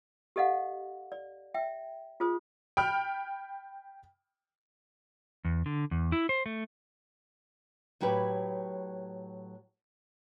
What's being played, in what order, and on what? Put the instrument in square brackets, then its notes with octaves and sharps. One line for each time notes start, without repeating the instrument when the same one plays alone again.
[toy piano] G4 A4 D#5 F5 F#5
D5
E5 G5
F4 G#4 C5 D#6
[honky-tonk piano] G5 B5 F6
[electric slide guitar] E2
D3
E2
E4
C5
A3
[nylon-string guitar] A2 F#3 E4 G4 B4